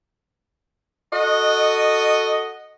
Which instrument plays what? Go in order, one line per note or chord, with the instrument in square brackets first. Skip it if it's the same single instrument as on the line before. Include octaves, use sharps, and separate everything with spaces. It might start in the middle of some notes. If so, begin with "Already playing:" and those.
[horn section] F#4 A4 D#5